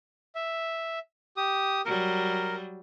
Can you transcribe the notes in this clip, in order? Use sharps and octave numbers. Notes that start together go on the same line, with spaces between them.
E5
G4 D#6
F#3 G3 A#4